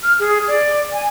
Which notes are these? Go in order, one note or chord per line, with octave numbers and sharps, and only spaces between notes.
F6
G#4
D5
G#5